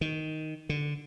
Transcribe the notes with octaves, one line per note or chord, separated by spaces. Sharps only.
D#3
D3